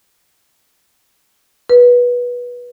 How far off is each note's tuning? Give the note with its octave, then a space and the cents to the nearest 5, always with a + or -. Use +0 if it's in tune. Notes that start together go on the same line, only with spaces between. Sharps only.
B4 -20